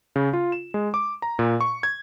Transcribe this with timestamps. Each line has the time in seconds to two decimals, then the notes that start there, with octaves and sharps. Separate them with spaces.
0.16 C#3
0.33 F4
0.52 E7
0.74 G#3
0.94 D6
1.22 A#5
1.39 A#2
1.61 C#6
1.83 G#6